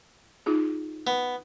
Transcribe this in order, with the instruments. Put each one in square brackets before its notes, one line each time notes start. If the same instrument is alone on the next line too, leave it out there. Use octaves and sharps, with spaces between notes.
[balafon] D#4 F4 G#4
[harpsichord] B3